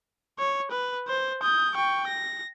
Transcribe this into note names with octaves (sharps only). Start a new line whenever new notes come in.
C#5
B4
C5
D#6 G6
G5 C#6
A#6